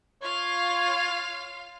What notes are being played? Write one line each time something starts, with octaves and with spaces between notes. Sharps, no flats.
F4 C#5 F5